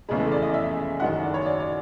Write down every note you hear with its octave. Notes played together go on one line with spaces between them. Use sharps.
F1 E2 C#3 E3 G#3 G#4
A4
D5
D#5
E5
F#2 D#3 G#3 F#5
D5
C#5
D5
D5